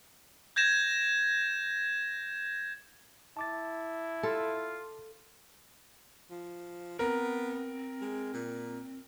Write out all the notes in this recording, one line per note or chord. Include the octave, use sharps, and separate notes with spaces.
G6 G#6 A#6 E7
E4 A5 D6 A6
F4 A4
F3
B3 C4 A#4
G#3
A#2